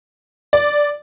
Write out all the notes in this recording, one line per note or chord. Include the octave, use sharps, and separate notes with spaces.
D5